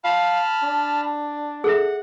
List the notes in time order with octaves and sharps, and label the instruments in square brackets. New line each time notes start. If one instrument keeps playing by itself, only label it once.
[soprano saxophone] F5 [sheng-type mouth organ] A5 B5 F6
[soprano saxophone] D4
[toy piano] G#4 A4 E5 [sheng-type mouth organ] F#5